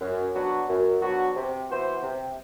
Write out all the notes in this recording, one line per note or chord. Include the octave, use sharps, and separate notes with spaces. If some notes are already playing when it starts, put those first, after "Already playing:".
F#2
F#3 B3 D4 F#4
F#2
F#3 B3 D4 F#4
C3
E3 B3 F#4 C5
C3